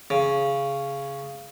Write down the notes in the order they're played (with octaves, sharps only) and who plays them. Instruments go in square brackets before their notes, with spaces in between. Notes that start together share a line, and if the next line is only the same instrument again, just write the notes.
[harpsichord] C#3